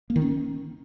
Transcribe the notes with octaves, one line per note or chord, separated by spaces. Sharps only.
A#3
D#3
C#4